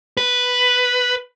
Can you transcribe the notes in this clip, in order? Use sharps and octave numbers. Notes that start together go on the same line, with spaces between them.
B4